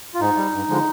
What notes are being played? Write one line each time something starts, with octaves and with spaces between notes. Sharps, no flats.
F4
G#2 D#4
G3
G2
D3 F3 G#3